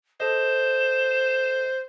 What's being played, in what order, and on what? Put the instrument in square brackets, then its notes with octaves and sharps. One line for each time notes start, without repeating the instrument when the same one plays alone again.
[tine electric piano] A4 D#5 [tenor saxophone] C5 [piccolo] E7